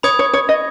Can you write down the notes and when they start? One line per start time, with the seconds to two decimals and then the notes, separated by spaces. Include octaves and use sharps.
0.03 C#5 B5 D#6 G#6
0.19 C#5
0.33 C#5
0.49 D#5